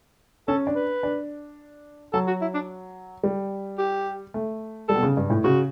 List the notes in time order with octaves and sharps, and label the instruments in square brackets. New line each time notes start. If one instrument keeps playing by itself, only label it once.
[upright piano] C#4 [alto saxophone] A4
[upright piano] D4
[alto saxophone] B4
[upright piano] D4
[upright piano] F#3 [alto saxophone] A4
[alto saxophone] F#4
E4
D4
[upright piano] G3
[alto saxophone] G4
[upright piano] A3
[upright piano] G3 [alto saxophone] A4
[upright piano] B2
C#3
G2
A2
[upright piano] C#3 [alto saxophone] F#4